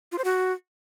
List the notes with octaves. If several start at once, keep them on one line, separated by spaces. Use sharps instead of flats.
F4
C5
F#4